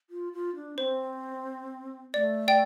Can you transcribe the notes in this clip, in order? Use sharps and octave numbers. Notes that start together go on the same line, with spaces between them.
F4
F4
D4
C4 C5
A3 D5
D5 G5